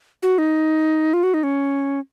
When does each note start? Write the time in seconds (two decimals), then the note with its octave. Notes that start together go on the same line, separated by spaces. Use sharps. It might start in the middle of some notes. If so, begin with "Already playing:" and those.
0.23 F#4
0.38 D#4
1.13 F4
1.23 F#4
1.34 D#4
1.43 C#4